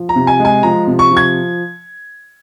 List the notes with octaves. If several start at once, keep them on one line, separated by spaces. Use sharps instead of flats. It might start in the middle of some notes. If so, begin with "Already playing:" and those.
Already playing: F3
A#5
C3
G#5
G#3
G#5
F3 A#5
C3
C#6
F3
G#6